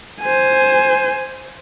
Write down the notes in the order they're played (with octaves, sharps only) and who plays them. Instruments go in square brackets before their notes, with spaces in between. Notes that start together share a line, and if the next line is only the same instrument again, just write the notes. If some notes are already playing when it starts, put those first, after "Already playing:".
[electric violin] C5 G#5